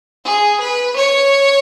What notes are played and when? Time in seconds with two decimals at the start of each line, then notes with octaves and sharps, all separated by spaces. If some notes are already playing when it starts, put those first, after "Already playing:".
0.25 G#4
0.60 B4
0.96 C#5